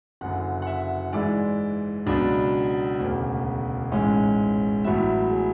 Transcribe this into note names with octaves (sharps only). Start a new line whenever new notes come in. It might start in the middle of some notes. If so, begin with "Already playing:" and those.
F#1 F#2 D3 F#5
F#5
E5
G#2 E3 G#3 D5
C#2 B2 F#3 B3 D4
E1 D2 C#3
A1 G#2 G#3 C#4
A1 A2 F#3 B3 E5
G#4